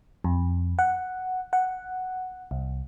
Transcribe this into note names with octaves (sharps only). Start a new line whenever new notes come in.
F2
F#5
F#5
C2